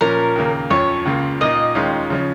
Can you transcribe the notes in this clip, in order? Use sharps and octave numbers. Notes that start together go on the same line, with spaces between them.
A#2 F3 C#4 A#4
D#2 C#3 A#3
F2 F3 C#4 C#5
C#2 C#3 A#3 F4
A#2 A#3 D#4 D#5
D#2 D#3 G#3 C#4 F4
C#3 F3 C#4